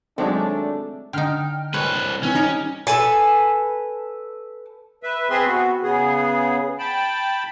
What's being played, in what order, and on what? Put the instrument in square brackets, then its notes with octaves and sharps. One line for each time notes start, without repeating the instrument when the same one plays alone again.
[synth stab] D#3 F#3 G#3 [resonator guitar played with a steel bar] A3 [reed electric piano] C4 [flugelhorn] D4
[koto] D3 D#4 [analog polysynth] G5 F6
[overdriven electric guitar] C2 B4 [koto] G#3 C#5 A5
[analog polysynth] E3 C4 [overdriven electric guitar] C#4
[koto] G3 A#4 [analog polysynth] D#4
[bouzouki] A4 B4 G#5 A5
[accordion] B4 E5
C4 G#4 B4 E5 C6
B3 F#4
C#3 B3 G#4
G5 A5 B5